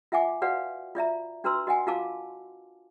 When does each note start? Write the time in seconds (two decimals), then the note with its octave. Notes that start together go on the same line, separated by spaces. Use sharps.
0.12 F4 E5 F#5 G#5 D6
0.42 F#4 B4 D5 F5 F#5
0.95 F4 D5 E5 A#5
1.44 D4 F#4 B4 A#5 C6 E6
1.67 F#4 D#5 F#5 G#5
1.87 F4 F#4 A#4 F5 A5 D6